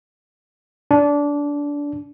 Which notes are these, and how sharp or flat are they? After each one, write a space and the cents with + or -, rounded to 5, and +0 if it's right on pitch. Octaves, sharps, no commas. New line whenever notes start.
D4 -20